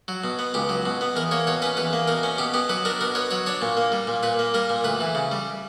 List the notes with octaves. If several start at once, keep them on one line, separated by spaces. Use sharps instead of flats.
F#3
B2
B3
C#2 G4
F#3
B2
B3
E2 A#4
A#3 C#5
B2 C#5
C#4 B4
E2 B4
A#3
B2 A#4
C#4
B2 G4
B3 G4
F#3 B4
D4 A#4
B2 A#4
B3 C#5
F#3 C#5
D4 C#5
A#2
A#3
G3
A#2
A#2 B4
A#3
G3 A#4
A#2
D2 B4
E3
C#3
G3